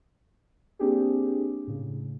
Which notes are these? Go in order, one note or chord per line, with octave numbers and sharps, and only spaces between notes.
A#3 C4 D4 G4 G#4
A2 C#3